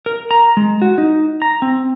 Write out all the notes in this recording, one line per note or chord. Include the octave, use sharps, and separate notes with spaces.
A#4
A#5
G#3
F#4
D#4
A#5
C4